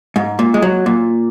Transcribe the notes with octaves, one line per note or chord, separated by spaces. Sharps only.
G#2
A#2
G#3
F#3
A#2